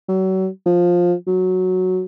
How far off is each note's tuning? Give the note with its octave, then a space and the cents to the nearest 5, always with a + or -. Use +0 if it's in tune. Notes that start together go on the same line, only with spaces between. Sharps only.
F#3 +35
F3 +10
F#3 -5